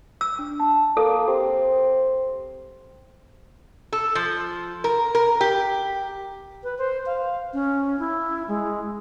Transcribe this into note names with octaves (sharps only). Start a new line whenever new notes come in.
E6
D4
A5
A#3 A4
C4 G4
A4
F3
A#4
A#4
G4
B4
C5
F5
C#4
E4
G#3